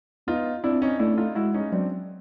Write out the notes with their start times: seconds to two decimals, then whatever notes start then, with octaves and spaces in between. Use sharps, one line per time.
0.27 B3 D#4 F4
0.64 C4 D4 E4
0.82 C#4 D#4
0.99 A3 D4 E4
1.18 D#4 F4
1.35 G#3 E4 F#4
1.54 C#4 D#4
1.72 F#3 C4 D4